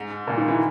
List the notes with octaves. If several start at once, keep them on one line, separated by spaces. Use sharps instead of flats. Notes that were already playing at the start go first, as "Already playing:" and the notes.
Already playing: G#2
A#2
D#3
E3